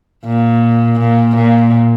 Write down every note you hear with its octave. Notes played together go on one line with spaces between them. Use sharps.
A#2
A#2
A#2